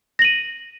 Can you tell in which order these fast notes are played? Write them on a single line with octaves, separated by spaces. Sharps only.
A#6 F#7 D#7